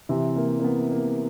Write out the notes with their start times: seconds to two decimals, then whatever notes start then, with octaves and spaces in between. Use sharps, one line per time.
0.09 C3 E3 C4
0.36 A#3
0.60 A#3
0.64 B3
0.92 A#3